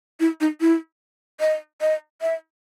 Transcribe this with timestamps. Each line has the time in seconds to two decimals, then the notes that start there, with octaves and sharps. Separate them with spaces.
0.20 E4
0.41 D#4
0.61 E4
1.40 D#5
1.81 D#5
2.22 E5